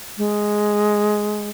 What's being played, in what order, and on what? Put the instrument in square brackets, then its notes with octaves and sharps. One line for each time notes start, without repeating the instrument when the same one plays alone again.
[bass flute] G#3